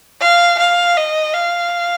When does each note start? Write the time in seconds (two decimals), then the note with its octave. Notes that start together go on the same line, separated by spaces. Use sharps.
0.21 F5
0.59 F5
0.97 D#5
1.34 F5